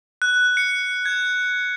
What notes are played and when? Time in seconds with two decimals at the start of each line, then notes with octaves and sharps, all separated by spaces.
0.22 F#6
0.57 C#7
1.05 G#6